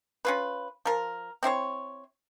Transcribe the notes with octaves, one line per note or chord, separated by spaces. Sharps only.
C#4 F4 B4
F3 A#4
C4 E4 C5 C#5